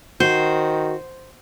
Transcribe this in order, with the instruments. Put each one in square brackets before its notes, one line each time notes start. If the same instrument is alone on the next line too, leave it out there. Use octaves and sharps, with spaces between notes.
[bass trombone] D#3 [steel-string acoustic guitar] F#4 [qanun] C5